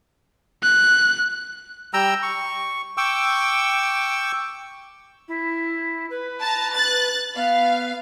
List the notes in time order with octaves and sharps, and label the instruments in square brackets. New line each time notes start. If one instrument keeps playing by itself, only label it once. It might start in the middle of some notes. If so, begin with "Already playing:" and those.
[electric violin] F#6
[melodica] G3 G5 A#5 E6
C#6
G5 C#6 D6 E6
[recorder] E4
B4
[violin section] A5 A#5
F#6 A6
[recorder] B3 [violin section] F5